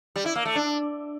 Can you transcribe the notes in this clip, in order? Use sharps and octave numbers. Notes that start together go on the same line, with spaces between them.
G3
E4
A#3
A3
D4